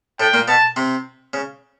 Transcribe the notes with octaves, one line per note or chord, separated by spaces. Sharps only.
A2 A3 G5
A#2 A#3
B2 B3 A5
C3 C4
C#3